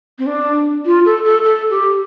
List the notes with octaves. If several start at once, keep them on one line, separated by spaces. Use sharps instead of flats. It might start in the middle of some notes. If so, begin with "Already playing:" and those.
C4
D4
F4
A4
A4
A4
G4